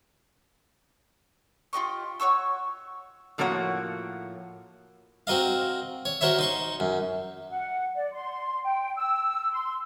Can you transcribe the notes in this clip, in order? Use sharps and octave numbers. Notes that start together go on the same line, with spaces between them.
F4 G4 D#5 C#6
F#4 C#5 C#6 E6
A2 F3 A#3 F#4 C#5 F#5
C4 F#4 A#4 D#5 F5
C#5
F#4 A#4 C5 C#5 E5
D#4 C6 C#6
F#2
F#5
D5
C6
G5
E6
C6